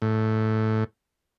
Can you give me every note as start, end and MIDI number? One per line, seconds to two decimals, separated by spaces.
0.02 0.84 45